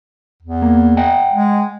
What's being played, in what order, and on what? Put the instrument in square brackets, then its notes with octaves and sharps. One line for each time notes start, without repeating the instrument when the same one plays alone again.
[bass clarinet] E2
[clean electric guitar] A#3
D#5 F#5 G5
[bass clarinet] G#3